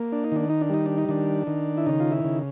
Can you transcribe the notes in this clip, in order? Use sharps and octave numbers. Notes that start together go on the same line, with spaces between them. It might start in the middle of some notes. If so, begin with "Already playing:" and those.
Already playing: A#3
D4
D#4
D#3 D4
D#4
D4
G3 D#4
D4
D#4
D#3 D4
D#3
E4
C#3 D#4
F4
E4
C#3